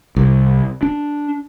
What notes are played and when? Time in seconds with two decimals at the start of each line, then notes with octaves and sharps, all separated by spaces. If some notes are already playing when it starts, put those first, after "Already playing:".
0.16 C2
0.83 D4